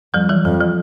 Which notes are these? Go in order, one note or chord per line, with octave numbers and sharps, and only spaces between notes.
F2 F3 G3
E3 F#3
F2 F3
F3